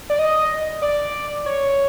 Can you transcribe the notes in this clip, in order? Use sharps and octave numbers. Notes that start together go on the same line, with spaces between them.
D5
D#5
D5
C#5